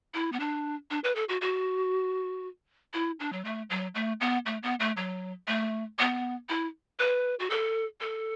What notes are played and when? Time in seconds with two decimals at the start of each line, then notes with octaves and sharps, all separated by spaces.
0.14 E4
0.32 B3
0.40 D4
0.91 D4
1.04 B4
1.15 A4
1.29 F#4
1.41 F#4
2.94 E4
3.20 D4
3.33 F#3
3.44 A3
3.70 F#3
3.95 A3
4.21 B3
4.46 A3
4.63 B3
4.80 A3
4.97 F#3
5.47 A3
5.99 B3
6.49 E4
6.99 B4
7.39 F#4
7.50 A4
8.01 A4